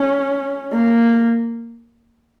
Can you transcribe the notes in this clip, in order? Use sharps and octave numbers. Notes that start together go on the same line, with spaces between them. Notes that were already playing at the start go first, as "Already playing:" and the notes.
Already playing: C#4
A#3